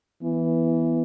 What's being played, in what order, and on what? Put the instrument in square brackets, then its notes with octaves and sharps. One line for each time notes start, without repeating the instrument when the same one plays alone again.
[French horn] E3 [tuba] B3